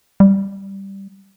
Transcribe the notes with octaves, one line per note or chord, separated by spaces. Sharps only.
G3